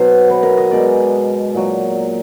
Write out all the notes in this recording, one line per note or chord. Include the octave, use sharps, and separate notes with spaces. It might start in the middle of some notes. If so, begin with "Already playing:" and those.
Already playing: B2 F#3 C5
B4
A#4
D#5
B2 G#3 D5
A#2 F#3